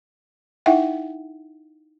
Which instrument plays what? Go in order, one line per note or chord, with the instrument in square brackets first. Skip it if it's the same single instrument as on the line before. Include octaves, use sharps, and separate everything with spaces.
[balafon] D#4 E4 E5 F#5 G5